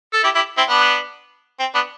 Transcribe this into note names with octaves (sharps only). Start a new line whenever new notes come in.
A4
E4 G4
E4 G4
C4 E4
B3 D4
C4
B3 D4